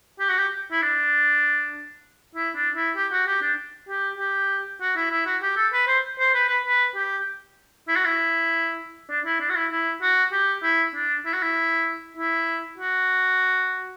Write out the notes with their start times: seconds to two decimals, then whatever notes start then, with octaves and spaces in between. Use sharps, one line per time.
0.19 G4
0.29 F#4
0.38 G4
0.72 E4
0.82 D4
2.35 E4
2.55 D4
2.76 E4
2.96 G4
3.12 F#4
3.27 G4
3.42 D4
3.89 G4
4.18 G4
4.81 F#4
4.96 E4
5.11 E4
5.26 F#4
5.42 G4
5.56 A4
5.73 B4
5.87 C5
6.19 C5
6.34 B4
6.48 B4
6.64 B4
6.96 G4
7.88 E4
7.96 F#4
8.05 E4
9.10 D4
9.25 E4
9.40 D4
9.49 F#4
9.56 E4
9.72 E4
10.02 F#4
10.32 G4
10.63 E4
10.95 D4
11.25 E4
11.33 F#4
11.42 E4
12.17 E4
12.78 F#4